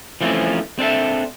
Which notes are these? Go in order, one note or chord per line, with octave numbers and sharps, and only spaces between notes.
E3 F3 A3 A#3 C4 C#4
C4 D4 A4 E5